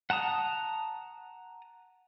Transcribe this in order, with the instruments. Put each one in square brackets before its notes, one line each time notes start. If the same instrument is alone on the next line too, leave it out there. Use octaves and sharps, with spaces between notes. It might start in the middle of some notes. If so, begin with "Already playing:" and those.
[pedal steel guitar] F#5 A5 A#5 D#6